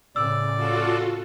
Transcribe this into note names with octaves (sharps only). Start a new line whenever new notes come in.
A2 C#3 E3 D5 E6
F4 F#4 A4